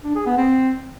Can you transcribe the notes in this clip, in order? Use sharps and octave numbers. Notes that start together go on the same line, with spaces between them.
D4
G#4
B3
C4